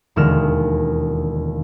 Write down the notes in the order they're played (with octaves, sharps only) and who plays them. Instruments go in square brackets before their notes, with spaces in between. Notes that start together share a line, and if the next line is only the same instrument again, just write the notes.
[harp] E1 D#2 D3 G#3 F6 E7